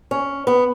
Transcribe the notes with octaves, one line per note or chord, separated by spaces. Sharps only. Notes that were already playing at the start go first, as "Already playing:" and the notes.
C#4
B3